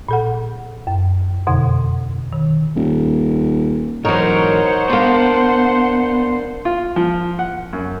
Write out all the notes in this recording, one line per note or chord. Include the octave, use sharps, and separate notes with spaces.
A#2 A4 F#5
F#2
F2 B2 D3
D#3
D#1
G#2 E3 F#3 D#4 A#4 C5 C#5 F#5
A#3 B3 D4 C6
F4
F3
F#5
F#2